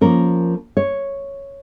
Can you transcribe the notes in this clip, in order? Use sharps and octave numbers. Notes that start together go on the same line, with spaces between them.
F3 A#3 C#4 A#4
C#5